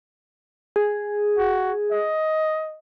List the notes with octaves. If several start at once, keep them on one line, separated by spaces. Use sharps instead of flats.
G#4
F#4
D#5